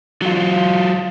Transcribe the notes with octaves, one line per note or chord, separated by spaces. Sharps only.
F#3 F4